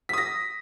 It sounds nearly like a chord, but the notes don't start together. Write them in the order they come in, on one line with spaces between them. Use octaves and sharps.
B6 D#6 A#6